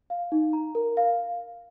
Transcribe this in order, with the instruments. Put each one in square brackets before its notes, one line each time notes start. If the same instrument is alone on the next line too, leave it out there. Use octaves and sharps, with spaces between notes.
[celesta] F5
D#4
A#5
A#4
F5